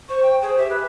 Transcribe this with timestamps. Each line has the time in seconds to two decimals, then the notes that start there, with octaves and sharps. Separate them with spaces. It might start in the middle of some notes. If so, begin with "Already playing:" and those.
0.09 C5 C#6
0.23 G5
0.42 G#4 C5
0.58 G4 E5
0.70 B4